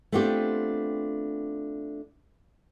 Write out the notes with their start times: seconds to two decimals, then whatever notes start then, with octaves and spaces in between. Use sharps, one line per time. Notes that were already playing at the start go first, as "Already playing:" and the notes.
0.12 A3 B3 C4 D4 F4 G4